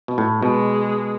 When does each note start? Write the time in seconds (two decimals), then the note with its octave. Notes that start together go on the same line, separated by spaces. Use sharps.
0.08 B2
0.18 A2
0.42 B2 G#3